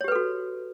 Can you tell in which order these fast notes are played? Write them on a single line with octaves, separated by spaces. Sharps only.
C#5 G4 B4 A4 F#4